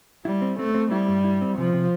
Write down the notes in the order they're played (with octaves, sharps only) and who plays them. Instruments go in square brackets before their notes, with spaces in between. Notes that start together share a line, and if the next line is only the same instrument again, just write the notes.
[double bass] G3 [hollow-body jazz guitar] E4
[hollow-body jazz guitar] C4
[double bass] A3 [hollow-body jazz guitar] C4
[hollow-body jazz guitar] C4
[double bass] G3 [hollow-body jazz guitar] E4
[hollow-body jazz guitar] G2
E4
C4
[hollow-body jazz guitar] C3 [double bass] F3
[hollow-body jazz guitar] C3